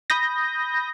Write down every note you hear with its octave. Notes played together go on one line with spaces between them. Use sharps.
B5 D#6 G6 A#6